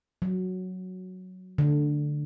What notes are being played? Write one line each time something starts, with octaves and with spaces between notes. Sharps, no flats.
F#3
D3